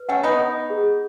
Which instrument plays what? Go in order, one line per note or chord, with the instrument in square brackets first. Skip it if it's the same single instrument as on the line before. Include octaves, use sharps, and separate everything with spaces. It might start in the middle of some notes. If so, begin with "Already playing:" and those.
Already playing: [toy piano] B4
[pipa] A3 C#4 [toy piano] F#5
[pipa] B3 D#4
[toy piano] G#5
G#4